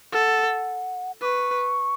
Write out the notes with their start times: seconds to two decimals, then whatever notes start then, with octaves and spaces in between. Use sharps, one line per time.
0.13 A4 F#5
1.22 B4 C#6 D6